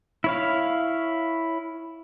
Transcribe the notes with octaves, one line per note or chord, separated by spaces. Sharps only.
E4 C#5 F5